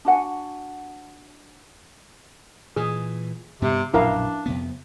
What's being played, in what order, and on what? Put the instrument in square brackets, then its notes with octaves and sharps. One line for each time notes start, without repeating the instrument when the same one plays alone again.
[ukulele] D4 F#4 F#5 G#5
[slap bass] A#2 E3 [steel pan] G#4
[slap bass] G2 B3 [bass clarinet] C3
[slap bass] A#1 F#2 B2 [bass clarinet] D4 [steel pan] E4 A#4 F5
[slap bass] F2 C3 B3